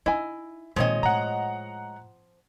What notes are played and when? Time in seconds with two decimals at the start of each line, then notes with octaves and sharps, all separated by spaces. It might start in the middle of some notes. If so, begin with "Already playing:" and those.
0.06 D#4 E4 D#5 G#5
0.76 A#2 D#3 F3 G#3 C4 C#5 D#5
1.03 A2 F#5 A#5